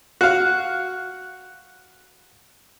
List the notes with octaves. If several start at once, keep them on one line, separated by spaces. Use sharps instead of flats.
F#4 F5